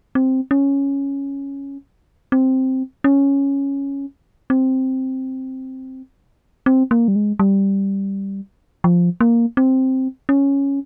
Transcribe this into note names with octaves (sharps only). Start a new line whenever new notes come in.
C4
C#4
C4
C#4
C4
C4
A#3
G3
G#3
G3
F3
A#3
C4
C#4